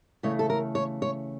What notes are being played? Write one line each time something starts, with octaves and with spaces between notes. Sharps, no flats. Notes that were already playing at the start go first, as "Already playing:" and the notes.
C#3 E3 A3 C#5
A4
A#4
C#5
C#5